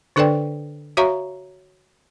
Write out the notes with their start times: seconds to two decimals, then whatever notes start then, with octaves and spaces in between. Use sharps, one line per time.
0.16 D3 D4 A4 B4 D5 G5
0.97 F#4 C#5 E5 F5 A#5 C#6